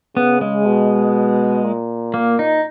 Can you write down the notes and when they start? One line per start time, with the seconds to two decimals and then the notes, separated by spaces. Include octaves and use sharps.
0.16 C#3 B3
0.41 G#3
0.65 B2
1.64 A#2
2.14 A#3
2.39 D#4